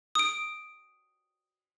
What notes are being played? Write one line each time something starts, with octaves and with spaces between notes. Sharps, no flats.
D#6 D7